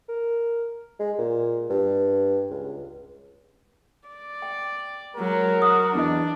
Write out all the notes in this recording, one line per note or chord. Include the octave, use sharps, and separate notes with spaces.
A#4
G#3
A#2
G2
C#2
D5
G5
F#3 G#3 A#4
F#4 D#6
E2 D4 C#5 D#5